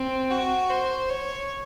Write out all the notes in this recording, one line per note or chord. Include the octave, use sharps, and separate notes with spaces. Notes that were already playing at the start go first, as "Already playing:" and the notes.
Already playing: C4
F#4
C5
C#5